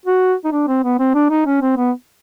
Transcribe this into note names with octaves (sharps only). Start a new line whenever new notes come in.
F#4
D#4
D4
C4
B3
C4
D4
D#4
C#4
C4
B3